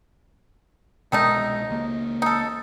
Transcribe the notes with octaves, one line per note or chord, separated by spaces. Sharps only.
C2 B2 D#3 G#3 A3 D#4
C#2 A#3
D#4 A4